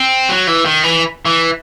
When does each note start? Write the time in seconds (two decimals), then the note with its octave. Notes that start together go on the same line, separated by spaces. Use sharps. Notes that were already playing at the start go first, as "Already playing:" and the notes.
Already playing: C4
0.29 F#3
0.47 E3
0.65 D#3
0.83 E3
1.25 E3